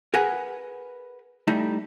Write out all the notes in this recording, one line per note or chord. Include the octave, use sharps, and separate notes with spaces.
G#4 A#4 B4 F#5 G#5
G3 A3 D#4 E4